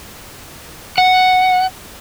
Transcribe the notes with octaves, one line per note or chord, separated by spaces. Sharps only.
F#5